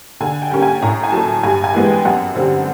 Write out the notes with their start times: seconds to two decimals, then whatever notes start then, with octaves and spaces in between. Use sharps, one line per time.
0.20 D3 G#5
0.42 G5
0.51 G3 A#3 C#4
0.62 G#5
0.82 A2 A#5
1.04 G#5
1.12 F#3 A3 A5
1.43 G2 G#5
1.64 G#5
1.74 E3 G#3 B3
1.85 G5
2.05 F#2 F#5
2.35 D3 G3 C4